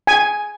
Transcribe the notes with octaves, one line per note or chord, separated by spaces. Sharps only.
G#5